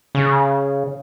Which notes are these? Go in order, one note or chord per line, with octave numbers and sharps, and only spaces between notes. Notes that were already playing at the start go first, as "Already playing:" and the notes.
C#3